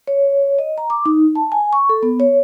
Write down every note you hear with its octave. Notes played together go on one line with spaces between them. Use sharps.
C#5
D#5
A#5
D6
D#4
A5
G#5
C#6
A4
B3
C#5